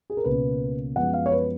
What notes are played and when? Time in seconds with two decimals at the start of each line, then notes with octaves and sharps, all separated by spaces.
0.10 G#4
0.17 A#4
0.24 C#2 B2 A#3 C#4 B4
0.96 F#2 F3 G#3 B3 F#5
1.14 F5
1.26 C#5
1.32 B4